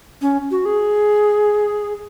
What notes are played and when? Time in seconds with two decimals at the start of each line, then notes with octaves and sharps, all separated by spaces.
0.22 C#4
0.51 F#4
0.65 G#4